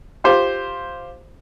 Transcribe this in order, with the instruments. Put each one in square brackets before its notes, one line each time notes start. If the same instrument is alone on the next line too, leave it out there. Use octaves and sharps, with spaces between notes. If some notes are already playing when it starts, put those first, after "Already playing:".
[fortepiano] F4 G4 C5